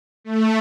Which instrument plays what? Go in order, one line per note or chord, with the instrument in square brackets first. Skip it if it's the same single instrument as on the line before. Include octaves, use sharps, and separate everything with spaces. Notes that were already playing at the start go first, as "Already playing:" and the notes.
[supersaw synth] A3